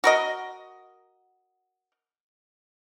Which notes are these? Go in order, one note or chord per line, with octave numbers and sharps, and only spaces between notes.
F#4 A#4 D#5